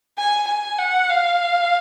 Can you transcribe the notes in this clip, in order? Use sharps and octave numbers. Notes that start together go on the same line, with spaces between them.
G#5
G#5
F#5
F5